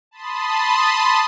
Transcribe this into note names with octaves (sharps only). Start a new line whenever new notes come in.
A5 B5 C6 D#6